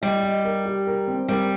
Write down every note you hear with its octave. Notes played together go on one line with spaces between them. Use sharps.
G3 D#5
D#5
A#4
G4
A#4
C4
G3 A#4